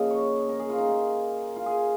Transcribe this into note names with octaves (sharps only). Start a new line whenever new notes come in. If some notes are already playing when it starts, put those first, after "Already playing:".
Already playing: C#3 F3 A#3 D#5 F5
C#5
A#4
G#4
F4
D#4
A#2 A#3
F4
G#4